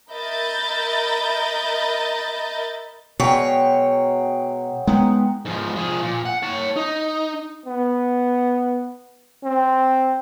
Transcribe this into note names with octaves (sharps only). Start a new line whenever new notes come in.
A#4 D#5 E5 B5 G6 A6
B2 F#3 G#3 C#5 G5
G#3 B3 D#4 A#4 G5
G#2 F3
F3 G#4
A#2
F#5
C#5 A5
D#4
B3
C4